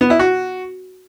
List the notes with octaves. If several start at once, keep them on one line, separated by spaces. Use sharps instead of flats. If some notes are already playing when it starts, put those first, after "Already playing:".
B3
E4
F#4